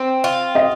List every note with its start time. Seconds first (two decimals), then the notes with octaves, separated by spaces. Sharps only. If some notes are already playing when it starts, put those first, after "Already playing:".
Already playing: C4
0.24 F4
0.55 D#5